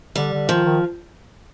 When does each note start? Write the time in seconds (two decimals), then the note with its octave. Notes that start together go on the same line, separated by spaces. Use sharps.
0.16 D3 G3
0.33 D3
0.49 D#3 F3
0.65 D#3